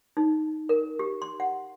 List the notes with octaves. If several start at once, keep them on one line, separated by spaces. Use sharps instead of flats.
D#4
A#4
G4
C6
F#5